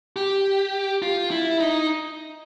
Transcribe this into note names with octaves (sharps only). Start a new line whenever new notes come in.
G4
F4
E4
D#4